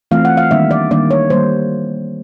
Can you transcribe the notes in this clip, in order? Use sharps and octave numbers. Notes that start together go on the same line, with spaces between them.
E3 A3 C4 F4 F5
F#5
F5
D#3 G3 A#3 D4 E5
D5
D#3 G3 A#3 D4 D5
C#5
D#3 G3 A#3 C5